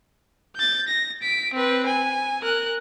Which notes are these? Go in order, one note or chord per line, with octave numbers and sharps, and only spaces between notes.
G6 A6
A#6
B6 D7
C4 B4
G#5
A#4 F#6